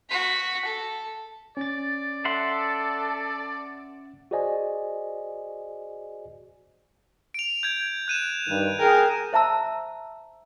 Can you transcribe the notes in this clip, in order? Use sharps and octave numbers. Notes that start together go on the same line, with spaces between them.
F#4 B6
A4
C#4 D5 A6
A4 E5 F#5 C6
F#4 G#4 C5 D5 D#5 G#5
D7 F7
G6 G#6
F#6 D#7 E7
G2 D#3
G#4 A#4 G5
C5 E5 A5 A#5 E6